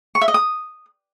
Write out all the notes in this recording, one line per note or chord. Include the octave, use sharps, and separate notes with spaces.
C#6
E5
D#5
D#6